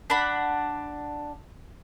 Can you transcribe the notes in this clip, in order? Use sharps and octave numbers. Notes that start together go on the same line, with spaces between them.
D4 F#5 B5